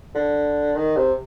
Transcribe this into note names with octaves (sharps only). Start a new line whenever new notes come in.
D3
D#3
C3